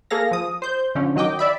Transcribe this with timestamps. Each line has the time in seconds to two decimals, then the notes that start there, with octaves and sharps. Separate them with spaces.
0.10 A#3 G#4 A4 F5 A#6
0.31 F3 D#6
0.62 C5 G6
0.95 D3 F3 C#4
1.16 D#3 F#3 D#5 G5 D6
1.39 D5 E5 B5